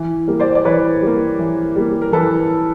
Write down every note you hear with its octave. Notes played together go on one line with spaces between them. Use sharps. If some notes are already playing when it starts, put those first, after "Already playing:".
Already playing: E3
G3 A#3
C5 D5
D5
E3 B4 C#5
G3
A#3
E3
G3 A#3
A#4
E3 A4 B4